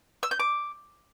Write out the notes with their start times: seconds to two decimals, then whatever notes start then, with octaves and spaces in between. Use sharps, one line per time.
0.23 E6
0.31 G6
0.40 D6